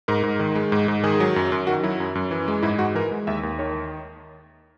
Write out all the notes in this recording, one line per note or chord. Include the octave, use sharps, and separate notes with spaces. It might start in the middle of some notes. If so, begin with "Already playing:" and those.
G#2 A#4
G#2
D#3
G#3
G#2
G#2
D#3 G#4
F#3
F#2
F#2
D#3 F#4
F#3 E4
F#2
F#2
E3
G#3
G#2 E4
G#2 F#4
E3 A#4
G#3
D#2 E5
D#2
D#3 C#5